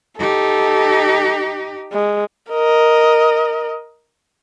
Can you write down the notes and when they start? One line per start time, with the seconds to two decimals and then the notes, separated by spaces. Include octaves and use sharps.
0.19 D#4 G4 A4
1.93 G#3
2.51 A#4 D#5